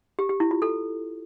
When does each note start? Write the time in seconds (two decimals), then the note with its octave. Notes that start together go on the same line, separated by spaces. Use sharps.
0.19 G4
0.29 G4
0.40 E4
0.51 F4
0.62 A4